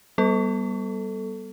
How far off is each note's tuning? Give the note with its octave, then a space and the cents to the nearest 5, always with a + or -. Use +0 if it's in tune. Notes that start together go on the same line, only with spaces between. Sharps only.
G3 -10 B3 -25 A4 +0